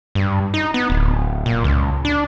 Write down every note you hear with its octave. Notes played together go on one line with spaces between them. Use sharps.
G2
D#4
B3
D1
A#2
C#2
D4